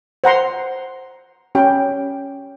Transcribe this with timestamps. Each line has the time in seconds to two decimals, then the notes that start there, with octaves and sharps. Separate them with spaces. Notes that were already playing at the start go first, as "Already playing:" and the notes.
0.24 C5 F#5 A#5 C6
1.55 C#4 G4 G5